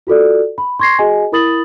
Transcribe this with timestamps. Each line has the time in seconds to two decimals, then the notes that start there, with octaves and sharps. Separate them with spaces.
0.07 F4 F#4 A4 D5
0.58 B5
0.79 C6 C#6 G#6 A#6 C7
0.99 F#4 G#4 D#5 G#5
1.32 E4 A#4 B5 D#6 A6 F#7